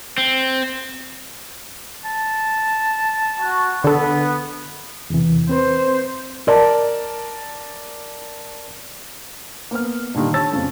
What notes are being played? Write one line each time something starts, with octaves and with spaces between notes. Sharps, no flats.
C4
A5
F#4
D3 B3 A4
E2 C3 E3
C4 B4 C5
A#4 D5 A5
A#3 B3 F6
G2 A#2 D3 D#3 G3
C#5 A5 E6 A6
F2 C#3 F3 A3